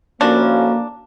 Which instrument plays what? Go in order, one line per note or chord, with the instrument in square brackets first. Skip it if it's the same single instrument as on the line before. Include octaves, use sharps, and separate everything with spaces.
[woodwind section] A2 F3 C#4 [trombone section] A#3 [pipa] D4 [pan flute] F#4